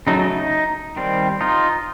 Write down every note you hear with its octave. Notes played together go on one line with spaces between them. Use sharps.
C#3 F#3 A3 D#4
D#4
D#3 G3 C4
D#4 F4